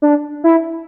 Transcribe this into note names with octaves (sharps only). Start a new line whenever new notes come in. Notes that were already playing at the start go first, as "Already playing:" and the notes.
D4
E4